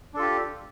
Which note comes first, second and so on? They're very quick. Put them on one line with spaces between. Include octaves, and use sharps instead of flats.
D4 A4 F4 G4